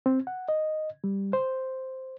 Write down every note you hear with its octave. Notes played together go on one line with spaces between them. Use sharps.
C4
F#5
D#5
G3
C5